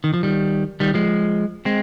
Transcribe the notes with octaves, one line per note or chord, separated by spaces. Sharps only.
D#3
F3
D#3 G3
D#3 G3
F3 G#3
G#3 C4